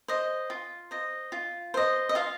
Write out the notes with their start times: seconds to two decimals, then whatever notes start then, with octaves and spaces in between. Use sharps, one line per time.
0.08 C5 D#5
0.50 F4
0.91 C5 D#5
1.32 F4
1.74 C5 D#5
2.09 D#5
2.15 F4 F5